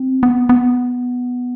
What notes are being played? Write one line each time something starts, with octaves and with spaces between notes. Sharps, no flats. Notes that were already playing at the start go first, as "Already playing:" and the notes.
Already playing: C4
B3
B3